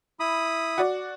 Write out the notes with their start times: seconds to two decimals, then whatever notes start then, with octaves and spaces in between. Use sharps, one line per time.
0.20 E4 B5 D#6
0.78 F#4 D5